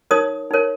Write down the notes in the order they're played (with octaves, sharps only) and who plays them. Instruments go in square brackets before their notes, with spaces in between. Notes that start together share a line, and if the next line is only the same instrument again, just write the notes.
[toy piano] D#4 A#4 C#5 D#6
D#4 A#4 C#5